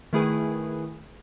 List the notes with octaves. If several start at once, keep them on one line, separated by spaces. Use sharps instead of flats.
D#3 A3 E4 G#4 B4 G#5